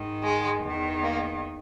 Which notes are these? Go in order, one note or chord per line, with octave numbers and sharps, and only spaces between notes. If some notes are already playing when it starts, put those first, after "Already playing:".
Already playing: G#2 D#3
G#3
E2 D#3
A#3